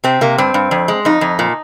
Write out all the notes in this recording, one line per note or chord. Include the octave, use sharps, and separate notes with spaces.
C3 C4
C3 A#3
G2 C4
G2
F2
G#3
F2 D#4
F2
A#2